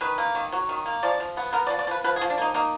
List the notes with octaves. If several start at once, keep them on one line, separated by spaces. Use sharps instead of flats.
D#3 B4
A#3
D#3
F#3
D#3
A#3
F3 D5
F3
B3
B3 A#4
D5
F3
D5
F3 B4
F3 B4
G#4
F3
D4
A#3 D#4
A#3 D#4